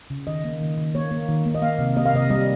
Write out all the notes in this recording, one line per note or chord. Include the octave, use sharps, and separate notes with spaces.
C#3
D#3 D#5
A#3
D#3
D#3
A#3 C#5
A#3
D#3
A#3
D#5
A#3 F5
C3
A#3 D#5
F5
C3 D#5
G3 D#5